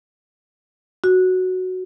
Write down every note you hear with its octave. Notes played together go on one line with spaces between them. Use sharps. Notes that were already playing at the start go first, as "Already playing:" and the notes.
F#4